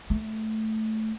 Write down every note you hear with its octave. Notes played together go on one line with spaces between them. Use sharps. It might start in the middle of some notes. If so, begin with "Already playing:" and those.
A3